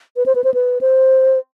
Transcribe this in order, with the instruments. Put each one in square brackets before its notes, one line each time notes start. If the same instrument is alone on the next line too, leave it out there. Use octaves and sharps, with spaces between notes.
[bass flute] B4
C5
B4
C5
B4
C5